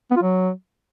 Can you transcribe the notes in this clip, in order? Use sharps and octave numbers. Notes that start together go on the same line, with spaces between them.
B3
F4
F#3